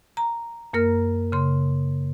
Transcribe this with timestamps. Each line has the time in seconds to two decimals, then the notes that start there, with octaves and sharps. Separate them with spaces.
0.17 A#5
0.73 F#2 A#3 A#4 F6
1.32 C#3 C6